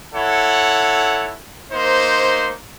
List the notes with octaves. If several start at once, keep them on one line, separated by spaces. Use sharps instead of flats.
E4 A4 C#5 F#5
A#3 D#4 C5